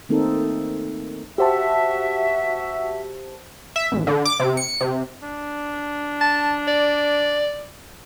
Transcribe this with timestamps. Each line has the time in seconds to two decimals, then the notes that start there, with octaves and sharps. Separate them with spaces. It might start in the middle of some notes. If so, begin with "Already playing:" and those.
0.09 D#3 A3 A#3 C4 D#4 A4
1.38 F#4 G4 C5 E5 A5
3.76 E5
3.92 A1
4.07 D3
4.25 D6
4.40 C3
4.57 C#7
4.81 C3
5.23 D4
6.21 A5
6.67 D5